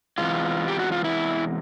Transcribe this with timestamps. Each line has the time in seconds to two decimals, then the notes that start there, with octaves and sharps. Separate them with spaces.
0.18 E2 C3 E3 G#3 F4
0.68 G4
0.79 F#4
0.92 F4
1.04 E4